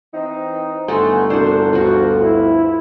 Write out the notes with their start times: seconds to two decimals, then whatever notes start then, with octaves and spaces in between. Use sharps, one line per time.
0.14 E3 C4 D#4
0.88 G1 A3 D#4 A4 F#5 G#5 C6
1.30 C2 D4 F#4 C5
1.73 D2 F3 F4 F#4
2.20 E4